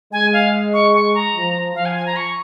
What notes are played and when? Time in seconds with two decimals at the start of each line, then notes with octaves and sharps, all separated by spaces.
0.12 G#3 G#5
0.33 F5
0.74 C#6
0.94 C#6
1.14 A#5
1.34 F3
1.75 F3 F5
1.85 G#5
1.95 G#5
2.06 A#5
2.16 C#6